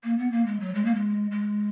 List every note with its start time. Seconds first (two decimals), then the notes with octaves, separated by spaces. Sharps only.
0.04 A#3
0.18 B3
0.32 A#3
0.46 G#3
0.60 F#3
0.75 G#3
0.85 A#3
0.94 G#3
1.31 G#3